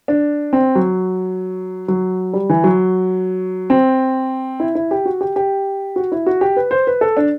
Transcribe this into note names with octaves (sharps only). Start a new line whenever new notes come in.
D4
C4
F#3
F#3
G3
E3
F#3
C4
E4
E4
G4
F#4
G4
G4
F#4
E4
F#4
G4
B4
C5
B4
A4
D4